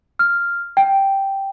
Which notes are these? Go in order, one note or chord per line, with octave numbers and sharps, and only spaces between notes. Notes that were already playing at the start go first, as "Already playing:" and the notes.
F6
G5